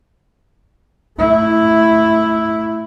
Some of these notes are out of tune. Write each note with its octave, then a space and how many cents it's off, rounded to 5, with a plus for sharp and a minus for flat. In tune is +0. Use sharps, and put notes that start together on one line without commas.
A3 +0 E4 +0